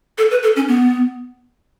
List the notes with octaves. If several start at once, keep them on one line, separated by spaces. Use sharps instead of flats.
A4
B4
A4
C#4
B3